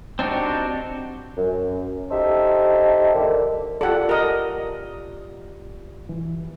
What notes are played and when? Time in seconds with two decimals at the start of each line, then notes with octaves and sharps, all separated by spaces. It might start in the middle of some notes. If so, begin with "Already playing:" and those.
0.19 C4 D4 D#4 F#4 G4
1.37 F#2
2.11 D#4 G4 A4 C5 D#5 E5
3.14 D3 D#3 G3 A#3
3.81 F4 G4 A4 D5 F#5
4.09 A#4 D#5
6.09 E3